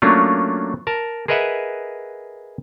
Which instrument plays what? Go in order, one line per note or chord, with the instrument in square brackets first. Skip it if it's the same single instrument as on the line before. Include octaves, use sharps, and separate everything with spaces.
[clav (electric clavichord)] F#3 A3 A#3 C#4 D4 F4
A#4 A5
G#4 A#4 B4 D#5 E5 F#5